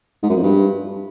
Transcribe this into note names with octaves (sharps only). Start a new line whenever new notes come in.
G#2
F#2
F2
G2